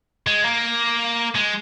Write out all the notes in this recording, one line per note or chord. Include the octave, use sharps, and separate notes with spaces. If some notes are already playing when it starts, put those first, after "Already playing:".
G#3
A#3
G#3